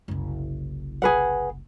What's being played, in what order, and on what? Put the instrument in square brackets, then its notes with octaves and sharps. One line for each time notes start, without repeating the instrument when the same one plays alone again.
[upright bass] F#1 C2
[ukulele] G#4 B4 F#5